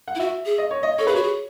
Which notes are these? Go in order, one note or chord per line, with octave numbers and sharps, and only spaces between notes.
F#5
E4
F#4 E5
G#4
D#5
C#5
D#5
A4 C#5
G#4 B4
F#4 C#5
G#4